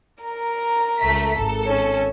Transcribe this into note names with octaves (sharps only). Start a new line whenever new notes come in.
A#4 A#5
C#2 A3 B6
G#1 A4
C#4